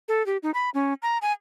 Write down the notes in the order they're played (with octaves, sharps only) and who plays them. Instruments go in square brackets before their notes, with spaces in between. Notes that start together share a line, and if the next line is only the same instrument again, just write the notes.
[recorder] A4
G4
D#4
B5
C#4
A#5
G#5